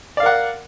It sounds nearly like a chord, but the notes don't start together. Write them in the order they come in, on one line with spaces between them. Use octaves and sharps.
D5 F5 A#4 F#5